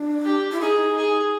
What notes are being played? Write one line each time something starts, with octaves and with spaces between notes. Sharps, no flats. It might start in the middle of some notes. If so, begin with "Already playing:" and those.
Already playing: D4
G4
E4
D#4 G#4
G#4